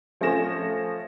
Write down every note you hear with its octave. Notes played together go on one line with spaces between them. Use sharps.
F3 A3 C#4 G#5 A#6 E7